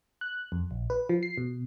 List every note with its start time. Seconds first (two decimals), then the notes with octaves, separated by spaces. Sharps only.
0.21 F#6
0.52 F2
0.71 A#1
0.90 B4
1.09 F3
1.23 C7
1.38 B2